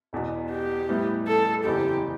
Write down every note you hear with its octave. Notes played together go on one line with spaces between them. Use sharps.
E1 E2 B2
G4
A2 G3 B3 E4
A4
F#1 E2 C3 E3 G4